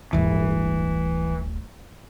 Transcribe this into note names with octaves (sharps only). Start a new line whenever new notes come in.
D1 G1 E3